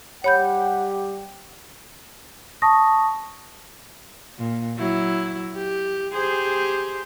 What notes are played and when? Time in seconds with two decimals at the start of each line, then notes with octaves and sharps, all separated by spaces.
0.24 G3 G4 C#5 F#5 B5 G6
2.62 A5 C#6 D#6 A#6
4.38 A#2
4.78 F#3 E4
5.55 G4
6.13 G4 G#4 C5